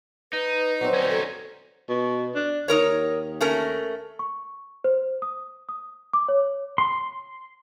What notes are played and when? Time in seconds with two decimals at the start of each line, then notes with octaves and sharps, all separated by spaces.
0.33 D#4 B4
0.81 F#3 G3 C4
0.94 C#4 D#4
1.10 A4
1.89 B2
2.35 D4
2.68 D#2 D#4 A#4 C#5
3.41 A3 C#4 A#4
4.19 C#6
4.84 C5
5.22 D#6
5.69 D#6
6.13 D6
6.28 C#5
6.78 C6